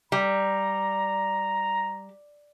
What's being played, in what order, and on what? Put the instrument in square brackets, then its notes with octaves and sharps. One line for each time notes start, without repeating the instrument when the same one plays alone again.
[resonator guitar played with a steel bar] G3 [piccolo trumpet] A#5